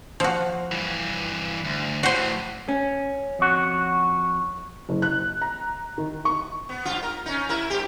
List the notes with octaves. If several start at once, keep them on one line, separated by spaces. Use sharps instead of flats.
F3 F#4
G2 E3
D2
A2 E3 F#4 C5
C#4
F2 F#4
F#1
F#6
A#5
D#3
C#6
B3
G2 F4
A#4
C#4 D#4
E4 A#4
G2 G4